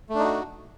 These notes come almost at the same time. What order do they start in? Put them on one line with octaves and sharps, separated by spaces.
A3 D4 D#4 F#4